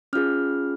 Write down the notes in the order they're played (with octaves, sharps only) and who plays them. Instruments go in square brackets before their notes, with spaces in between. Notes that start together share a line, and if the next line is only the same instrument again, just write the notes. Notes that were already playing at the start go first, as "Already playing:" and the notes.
[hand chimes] C#4 F4 G#4 F6